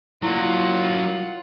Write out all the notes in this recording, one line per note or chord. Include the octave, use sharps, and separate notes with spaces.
F#3 A#3 E4 F4 D5 F#5